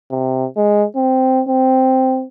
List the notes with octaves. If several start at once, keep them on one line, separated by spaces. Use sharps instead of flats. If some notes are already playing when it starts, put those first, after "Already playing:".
C3
G#3
C4
C4